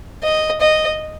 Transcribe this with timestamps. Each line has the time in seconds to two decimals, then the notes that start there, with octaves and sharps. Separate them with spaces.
0.23 D#5
0.61 D#5